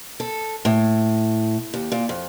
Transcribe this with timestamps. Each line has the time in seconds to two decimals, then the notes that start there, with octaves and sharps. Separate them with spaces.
0.20 A4
0.65 A2
1.74 D#2
1.92 A#2
2.09 F2